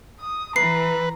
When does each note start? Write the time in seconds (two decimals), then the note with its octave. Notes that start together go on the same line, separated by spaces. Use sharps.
0.20 D#6
0.56 E3 B4 A#5 C7